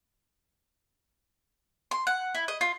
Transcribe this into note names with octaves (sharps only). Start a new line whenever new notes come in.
C6
F#5
E4
D#5
F4